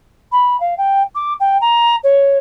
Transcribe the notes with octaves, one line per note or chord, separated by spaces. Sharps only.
B5
F5
G5
D6
G5
A#5
C#5